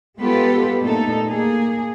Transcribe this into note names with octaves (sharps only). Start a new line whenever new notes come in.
G#3 B3 F4 G4 A4 B4
A#2 A3 D#4 A4
A#3 G#4